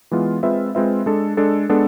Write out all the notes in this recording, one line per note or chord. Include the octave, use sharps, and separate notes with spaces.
E3 G#3 B3 F4
G#3 C4 F4 B4 E5
G#3 C4 F4 B4 E5
G#3 D4 A4
G#3 D4 A4
G#3 B3 D4 A4